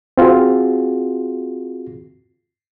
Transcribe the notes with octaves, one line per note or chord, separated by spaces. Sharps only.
C4 F4 F#4 G#4